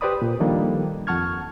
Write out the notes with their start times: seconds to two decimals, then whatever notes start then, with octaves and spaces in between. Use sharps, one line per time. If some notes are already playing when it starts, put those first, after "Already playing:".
0.01 G4 B4 C5 D5 B5 D#6
0.22 A#2
0.40 D#3 F3 G3 A#3 D4 A4
1.07 F2 F#5 A5 C#6 F6 G#6